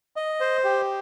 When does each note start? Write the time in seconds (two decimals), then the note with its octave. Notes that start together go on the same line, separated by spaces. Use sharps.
0.16 D#5
0.40 C5
0.64 G4